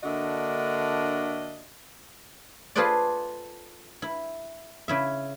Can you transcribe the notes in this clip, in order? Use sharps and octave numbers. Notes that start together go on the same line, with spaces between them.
D3 A#3 D4 F#4 D#5 E5
F4 G#4 A4 B4 C5 D5
E4
C#3 E4 E5